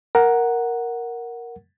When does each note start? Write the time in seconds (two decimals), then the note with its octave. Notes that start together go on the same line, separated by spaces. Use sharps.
0.15 A#4 F#5